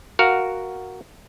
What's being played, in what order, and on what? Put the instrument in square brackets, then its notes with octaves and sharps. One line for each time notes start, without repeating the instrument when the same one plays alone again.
[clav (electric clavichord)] F#4 A#4 F5 F#5